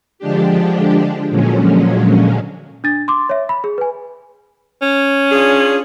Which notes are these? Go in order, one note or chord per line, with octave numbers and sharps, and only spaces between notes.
D3 F3 G#3 D4 G4
A#2 D3 F3 F#3 G#3 C#4
D4 A6
C6 D6
C#5 E5
B5
G#4
B4 G#5
C#4
D4 F4 G#4